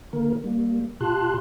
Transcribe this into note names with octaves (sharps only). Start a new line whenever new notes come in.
D3 A#3 A#4
G3 A#3
B2 F4 G4 A5 C6 F#6